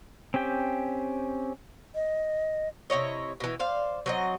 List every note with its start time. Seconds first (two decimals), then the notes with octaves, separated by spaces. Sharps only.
0.34 C4 C#4 G4 G5
1.95 D#5
2.90 C3 E4 C#5 D#5
3.40 B2 E3
3.59 C5 D5 F5
4.06 F#3 C4 D#5